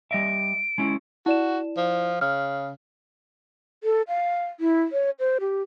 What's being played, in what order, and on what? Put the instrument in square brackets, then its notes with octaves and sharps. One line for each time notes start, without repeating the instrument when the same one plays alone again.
[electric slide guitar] G3 D#5 E5 [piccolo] D7
[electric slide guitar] G#3 C#4 E4
[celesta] E4 D5 E7 [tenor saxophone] F#4
[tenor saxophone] F3
[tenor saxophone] C#3 [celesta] F6
[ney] A4
F5
E4
C#5
C5
G4